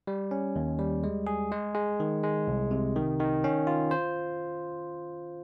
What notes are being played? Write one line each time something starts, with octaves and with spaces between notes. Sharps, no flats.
G3
C#4
D#2
G3
G#3
G#4
G#3
G#3
D#3
G#3
C2
C3
D#3
D#3
C#4
F4
C5